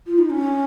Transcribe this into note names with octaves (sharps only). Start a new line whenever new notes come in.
F4
D#4
C#4